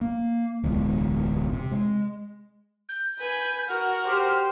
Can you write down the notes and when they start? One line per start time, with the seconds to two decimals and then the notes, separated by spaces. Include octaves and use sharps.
0.01 A#3
0.64 D1 B1 E2 G#3
1.53 C3
1.71 G#3
2.89 G6
3.19 B4 G#5
3.68 F#4 A#4 F6
4.05 G4 C5